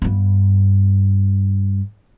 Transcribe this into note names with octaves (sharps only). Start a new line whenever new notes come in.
G2 B3